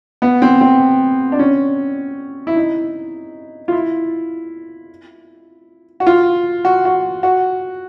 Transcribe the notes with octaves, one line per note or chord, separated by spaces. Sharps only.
B3
C4
C4
D4
C#4
E4
D#4
F4
E4
F#4
F4
F#4
F#4
F#4